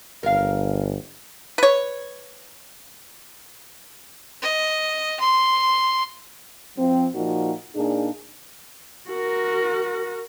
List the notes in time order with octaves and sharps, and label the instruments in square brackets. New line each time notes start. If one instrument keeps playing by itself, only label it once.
[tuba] G1 [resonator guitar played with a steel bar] A#4 F5
[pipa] B4 C#5
[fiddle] D#5
C6
[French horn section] F3 C4
A#2 F3 D#4 F#4
A#2 D4 D#4 G#4
[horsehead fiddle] F#4 A#4